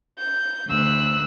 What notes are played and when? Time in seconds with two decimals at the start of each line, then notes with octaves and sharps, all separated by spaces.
0.18 G6
0.67 D2 E6 F#6